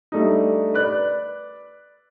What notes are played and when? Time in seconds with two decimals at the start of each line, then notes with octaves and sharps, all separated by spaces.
0.12 G3 A3 D4 D#4
0.74 B4 D5 F#6